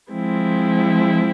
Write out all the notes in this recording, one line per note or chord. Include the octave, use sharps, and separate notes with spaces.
F3 G#3 C4 E4